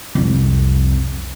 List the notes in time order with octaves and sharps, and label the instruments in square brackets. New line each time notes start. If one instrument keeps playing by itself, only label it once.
[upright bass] C2 F2